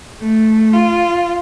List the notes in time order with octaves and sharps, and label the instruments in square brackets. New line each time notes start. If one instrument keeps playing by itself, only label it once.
[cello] A3
F4